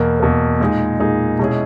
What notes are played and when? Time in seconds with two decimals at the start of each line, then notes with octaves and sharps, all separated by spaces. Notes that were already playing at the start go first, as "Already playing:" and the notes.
Already playing: E2 B2 A#3
0.20 E2 B2 A#3
0.60 A#2 G#3 D#4 G#4
1.00 A#2 G#3 D#4 G#4
1.39 B2 G#3 C#4 E4 G#4